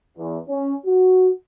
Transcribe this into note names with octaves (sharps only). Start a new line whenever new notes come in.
E2
C#4
F#4